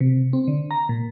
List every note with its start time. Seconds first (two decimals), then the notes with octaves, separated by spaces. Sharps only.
0.01 C3
0.33 C4
0.48 D3
0.71 A#5
0.89 A#2